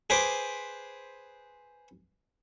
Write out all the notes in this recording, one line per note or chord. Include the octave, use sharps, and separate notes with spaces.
G#4 B4 C5 D6